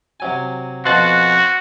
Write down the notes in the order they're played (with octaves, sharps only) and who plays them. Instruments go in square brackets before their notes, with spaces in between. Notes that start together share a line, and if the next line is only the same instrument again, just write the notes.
[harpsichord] C3 F#3 G#5
[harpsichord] F2 B2 F4 [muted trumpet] F#4 [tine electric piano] C6 F#6 A6